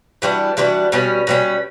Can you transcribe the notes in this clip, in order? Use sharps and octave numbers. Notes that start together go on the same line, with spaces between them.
E3 G3 D4 F#4
E3 G3 D4 F#4
B2 G3 C#4
B2 G3 C#4